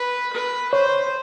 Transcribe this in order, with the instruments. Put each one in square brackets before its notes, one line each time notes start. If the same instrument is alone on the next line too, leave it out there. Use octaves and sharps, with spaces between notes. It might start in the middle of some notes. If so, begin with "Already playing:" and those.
Already playing: [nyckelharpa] B4
B4
[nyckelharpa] C5 [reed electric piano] C#5